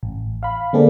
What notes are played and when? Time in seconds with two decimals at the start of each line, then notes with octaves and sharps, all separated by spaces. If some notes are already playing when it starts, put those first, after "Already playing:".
0.03 A1
0.43 F5 B5
0.73 D3 A#3 C4 G#4 A4 D5